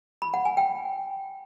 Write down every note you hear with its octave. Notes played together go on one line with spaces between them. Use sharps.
B5
F#5
G#5
G5